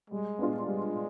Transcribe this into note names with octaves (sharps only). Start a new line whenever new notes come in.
G3 G#3
B3 D4 F4
G3 G#3